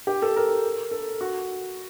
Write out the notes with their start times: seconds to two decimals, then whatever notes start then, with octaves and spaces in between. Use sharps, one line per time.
0.07 G4
0.22 A4
0.36 A#4
0.91 A4
1.21 F#4